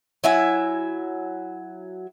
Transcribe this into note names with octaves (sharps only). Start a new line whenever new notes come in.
F#3 E4 E5 G#5